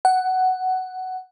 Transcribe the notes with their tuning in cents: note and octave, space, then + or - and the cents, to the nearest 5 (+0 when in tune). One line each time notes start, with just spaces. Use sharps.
F#5 +10